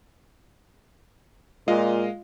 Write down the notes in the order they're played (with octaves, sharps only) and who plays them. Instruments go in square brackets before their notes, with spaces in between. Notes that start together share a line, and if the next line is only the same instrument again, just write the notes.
[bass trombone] A#2 [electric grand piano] G#3 D#5 F5 [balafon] F4